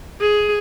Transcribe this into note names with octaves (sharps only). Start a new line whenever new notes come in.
G#4